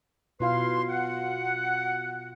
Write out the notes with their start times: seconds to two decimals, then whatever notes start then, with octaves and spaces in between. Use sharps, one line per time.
0.40 B2 E4 F4 B4 F5 C6
0.89 F#5